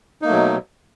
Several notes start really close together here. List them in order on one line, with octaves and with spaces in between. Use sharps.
D#4 A#3 A3 F#3 B2